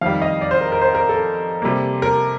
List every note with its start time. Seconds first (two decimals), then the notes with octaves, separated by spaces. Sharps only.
0.01 F2 D#3 G3 F5
0.22 D#5
0.41 D5
0.51 C5
0.61 A#4
0.72 A#4
0.81 C5
0.95 A#4
1.09 A4
1.62 C3 G3 A#3
2.02 A#4